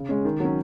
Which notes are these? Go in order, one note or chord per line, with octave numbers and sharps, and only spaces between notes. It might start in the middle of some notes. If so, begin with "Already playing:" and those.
Already playing: C#3
G#3 C#4
D#3
F#3 C#4